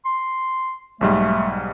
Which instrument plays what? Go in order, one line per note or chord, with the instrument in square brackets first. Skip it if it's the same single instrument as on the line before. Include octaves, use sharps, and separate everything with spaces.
[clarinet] C6
[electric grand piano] B1 G#2 G3 [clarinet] A3